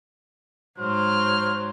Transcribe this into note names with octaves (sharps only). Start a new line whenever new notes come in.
G#2 F#3 C5 F6